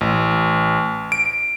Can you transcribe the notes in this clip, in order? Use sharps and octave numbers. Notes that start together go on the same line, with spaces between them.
A1
D7